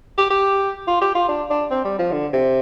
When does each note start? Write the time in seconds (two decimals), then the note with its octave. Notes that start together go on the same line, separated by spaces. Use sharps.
0.18 G4
0.31 G4
0.88 F4
1.01 G4
1.15 F4
1.28 D4
1.50 D4
1.71 C4
1.84 G3
1.99 F3
2.12 D3
2.33 C3